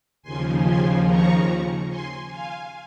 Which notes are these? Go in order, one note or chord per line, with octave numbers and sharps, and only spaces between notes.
D#2 C#3 F3 G#5 C6
G#5 C6
A#5 C#6
G#5 C6
F5 G#5